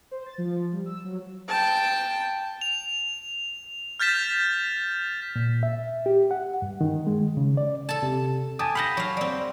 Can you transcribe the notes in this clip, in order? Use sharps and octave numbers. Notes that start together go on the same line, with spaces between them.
C5
A6
F3
G3
E6
F#3
G5 A5
F7
F6 G6 A6 B6 E7
A#2
E5
G4
F#5
G2
D#3
G#3
C#3
D5
A4 A5
C3
G4 G#5 A5 D#6
F5 F#5 A5 B5 G6 A#6
F#3 F5
G3 C4